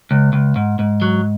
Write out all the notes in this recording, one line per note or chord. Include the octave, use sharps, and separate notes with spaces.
C#2
C#2
G#2
G#2
F#3